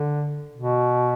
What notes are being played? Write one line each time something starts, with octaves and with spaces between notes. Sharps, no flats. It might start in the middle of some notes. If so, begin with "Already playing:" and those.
Already playing: D3
B2